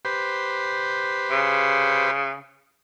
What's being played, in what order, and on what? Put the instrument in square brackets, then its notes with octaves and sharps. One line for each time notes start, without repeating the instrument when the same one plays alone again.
[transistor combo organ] G4 B4 C5
[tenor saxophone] C#3